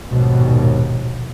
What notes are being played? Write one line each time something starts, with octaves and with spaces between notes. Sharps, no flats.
A#1 D#2 G#2 B2